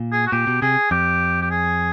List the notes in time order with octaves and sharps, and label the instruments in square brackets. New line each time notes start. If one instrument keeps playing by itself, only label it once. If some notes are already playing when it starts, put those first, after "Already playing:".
Already playing: [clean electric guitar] A#2
[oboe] G#4
F#4
[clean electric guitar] A#2 [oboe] G4
[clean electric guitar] B2
[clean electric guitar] C3 [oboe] G#4
[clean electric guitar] F2 [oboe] G4
[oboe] G4
G#4